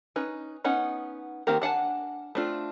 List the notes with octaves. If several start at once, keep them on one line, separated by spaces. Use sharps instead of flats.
C#4 D#4 B4
B3 C#4 D#4 F#5
D#3 A#3 C4 G4 A#4
D4 F#5 G#5 A5
A3 C4 D4 F4